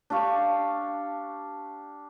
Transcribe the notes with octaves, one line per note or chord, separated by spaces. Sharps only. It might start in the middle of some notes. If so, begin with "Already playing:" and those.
D4 G4 F5 C#6